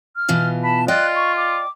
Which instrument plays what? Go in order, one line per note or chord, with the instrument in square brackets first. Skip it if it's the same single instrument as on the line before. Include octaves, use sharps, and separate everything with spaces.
[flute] F6
[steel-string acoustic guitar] B2 E3 F4
[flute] A5 [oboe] B5
[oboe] F4 [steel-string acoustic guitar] D5 D#5 G5 [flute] F#6
[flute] C#6
D6